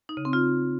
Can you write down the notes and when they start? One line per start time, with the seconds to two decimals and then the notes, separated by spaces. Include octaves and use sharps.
0.09 D#4
0.17 C#3
0.25 C4
0.33 F4